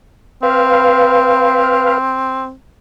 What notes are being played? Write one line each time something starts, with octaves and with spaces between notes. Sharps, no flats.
C4 B4 F5